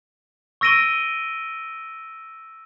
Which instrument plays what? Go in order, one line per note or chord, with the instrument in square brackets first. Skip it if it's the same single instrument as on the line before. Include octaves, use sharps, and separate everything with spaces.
[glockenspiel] C#6 E6 A#6 D7 D#7 G7